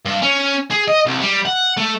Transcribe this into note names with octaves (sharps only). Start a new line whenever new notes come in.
G2
C#4
G#4
D#5
C2
G3
F#5
A3